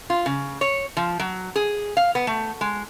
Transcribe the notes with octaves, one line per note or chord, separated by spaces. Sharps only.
F4
C#3
C#5
F3
F#3
G#4
F5
B3
A3
G#3